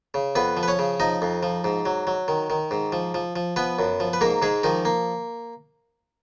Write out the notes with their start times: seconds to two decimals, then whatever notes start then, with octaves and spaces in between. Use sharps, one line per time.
0.14 C#3
0.35 F2 B3 B4
0.57 F3
0.63 B4
0.68 C#4 C#5
0.79 C#3
1.00 F3 D#4 D#5
1.22 F2
1.43 F3
1.64 G#2
1.85 F#3
2.07 F#3
2.28 D#3
2.50 D#3
2.71 G#2
2.92 F3
3.14 F3
3.36 F3
3.56 F3 B3 B4
3.79 F#2
4.00 F3
4.13 B4
4.21 G#2 A#3 A#4
4.42 G#2 G#3 G#4
4.63 D#3 F3 D#4
4.85 A#3